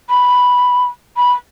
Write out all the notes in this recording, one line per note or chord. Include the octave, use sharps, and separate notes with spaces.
B5
B5